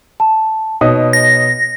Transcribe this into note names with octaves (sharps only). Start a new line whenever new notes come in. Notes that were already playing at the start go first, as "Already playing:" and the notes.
A5
B2 D#4 C#5 D#6
A#6